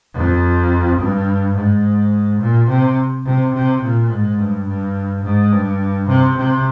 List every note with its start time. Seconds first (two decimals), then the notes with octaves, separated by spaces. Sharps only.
0.14 F2
0.99 G2
1.55 G#2
2.40 A#2
2.69 C3
3.25 C3
3.54 C3
3.82 A#2
4.10 G#2
4.38 G2
4.67 G2
5.23 G#2
5.51 G2
6.08 C3
6.37 C3